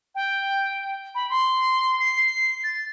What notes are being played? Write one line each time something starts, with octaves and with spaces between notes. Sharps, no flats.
G5
B5
C6
C7
A6